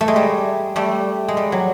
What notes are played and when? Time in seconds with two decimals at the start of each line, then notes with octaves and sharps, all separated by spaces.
0.01 A3
0.08 G#3
0.16 G3
0.76 G3 A3
1.28 G#3
1.37 G3
1.52 F#3